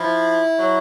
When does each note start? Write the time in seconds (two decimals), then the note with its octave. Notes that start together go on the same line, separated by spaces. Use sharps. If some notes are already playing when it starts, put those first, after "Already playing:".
Already playing: F3 E4
0.59 F#3